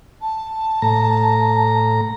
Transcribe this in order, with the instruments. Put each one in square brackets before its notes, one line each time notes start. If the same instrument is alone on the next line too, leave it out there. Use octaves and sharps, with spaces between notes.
[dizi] A5
[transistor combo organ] A2 A#5